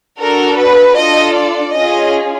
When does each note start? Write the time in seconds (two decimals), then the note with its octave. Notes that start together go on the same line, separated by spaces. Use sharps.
0.19 D4 F#4 A4 A#4
0.57 B4
0.96 D4 F4 A4 D#5
1.35 D5
1.73 C#4 F4 G#4 D#5